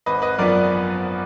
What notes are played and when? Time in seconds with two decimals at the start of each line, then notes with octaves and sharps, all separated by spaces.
0.06 G#1 B4 D#5
0.22 B4 D#5
0.38 F#2 F3 B3 A#4 D5